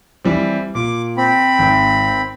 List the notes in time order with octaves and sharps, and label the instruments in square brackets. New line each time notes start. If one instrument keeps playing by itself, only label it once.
[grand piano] E3 G3 C4
[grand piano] A#2 [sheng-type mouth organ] D6
[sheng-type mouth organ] C4 B5
[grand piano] G#1